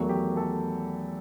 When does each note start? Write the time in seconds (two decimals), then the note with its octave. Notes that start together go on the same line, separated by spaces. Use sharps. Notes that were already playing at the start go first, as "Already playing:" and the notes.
Already playing: E2 D#3 F#3 A3 F#4
0.09 G4
0.37 A4